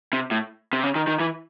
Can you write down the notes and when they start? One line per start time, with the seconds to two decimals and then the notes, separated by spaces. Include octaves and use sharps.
0.13 C3
0.31 A2
0.73 C3
0.84 C#3
0.95 D#3
1.07 D#3
1.20 E3